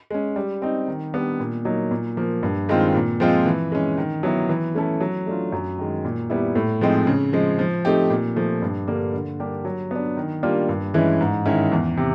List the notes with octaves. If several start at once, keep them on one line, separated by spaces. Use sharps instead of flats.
G#3 C#4
G3
C4 D#4
D#3
G3 B3 D4
A#2
F#3 A#3 D#4
A#2
F3 A#3
G2
D#3 G#3 C4 F4
A#2
F3 G#3 C4 F4
E3
G#3 C#4
D#3
F#3 B3 E4
E3
A3 C#4 E4 A4
F#3
A3 D4 F4
F#2
D#3 G#3
A#2
G3 B3 E4
A2
F3 G#3 C4 D#4
C#3
F3 G#3
F3
A3 C4 D#4 G4
A#2
F3 A3
G2
D3 G3 A#3
D3
G3 A#3 D4 G4
F#3
B3 D4
D#3
G3 A#3 D4 F4
G2
E3 G#3 C#4 E4
G#2
D#3 G#3 C#4 E4
E2
C3